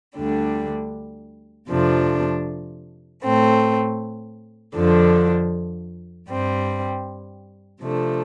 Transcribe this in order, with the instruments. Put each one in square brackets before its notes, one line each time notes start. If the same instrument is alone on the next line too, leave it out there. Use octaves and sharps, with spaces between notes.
[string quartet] D2 D3 G3 D4
F2 C3 F3 A3 D4
A2 A3 C4
F2 D3 F3 D4
G2 G3 C4
C3 F3 A3 D4